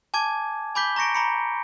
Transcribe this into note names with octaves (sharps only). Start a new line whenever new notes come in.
G#5 A5 D6 G#6
G#5 B5 D6 G6 B6 G7
A#5 C#6 A#6 C#7 D7
A#5 B5 C#7